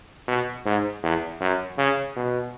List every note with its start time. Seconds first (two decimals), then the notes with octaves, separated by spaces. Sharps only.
0.28 B2
0.66 G#2
1.03 E2
1.41 F#2
1.78 C#3
2.16 B2